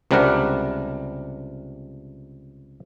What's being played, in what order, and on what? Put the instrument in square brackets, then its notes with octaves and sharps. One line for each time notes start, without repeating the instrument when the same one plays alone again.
[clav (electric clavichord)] C#2 C3 G3 D4 A#4 F#5